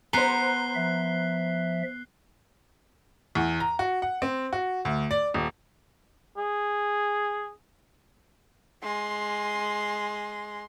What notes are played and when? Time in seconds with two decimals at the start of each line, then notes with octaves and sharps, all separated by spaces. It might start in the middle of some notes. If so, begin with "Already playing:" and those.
0.13 B3 C5 A#5 F#6 C7 G7
0.75 F3 E5
3.35 E2
3.60 A#5
3.79 F#4
4.02 F#5
4.22 C4
4.53 F#4
4.85 D2
5.11 D5
5.34 D#1
6.37 G#4
8.83 G#3 C6